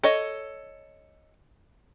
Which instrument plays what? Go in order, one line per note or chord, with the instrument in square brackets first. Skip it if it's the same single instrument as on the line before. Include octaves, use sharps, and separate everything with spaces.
[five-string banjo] A4 C#5 D#5